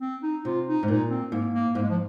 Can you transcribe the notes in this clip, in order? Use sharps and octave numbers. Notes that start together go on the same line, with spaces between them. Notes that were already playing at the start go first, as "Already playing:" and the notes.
C4
D#4
C3 F4
D#4
G#2
A#2 D#4
C4
G#2 A#3
A#3
G#2 A#3
G#3
F3